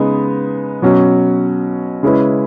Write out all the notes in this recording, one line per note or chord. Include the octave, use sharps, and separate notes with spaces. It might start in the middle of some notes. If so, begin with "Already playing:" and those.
Already playing: C#3 G#3 B3 D#4
B2 F#3 C#4 F#4
C#3 G#3 C#4 E4 B4